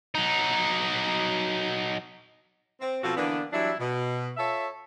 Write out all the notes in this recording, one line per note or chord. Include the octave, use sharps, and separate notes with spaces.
F#3 D#4
C4
B2 F3 C4 F#4 A4 F5
D3 E3 A#3 B3 D4
E3 F#3 G3 D4 E4
B2
F4 A4 C#5 E5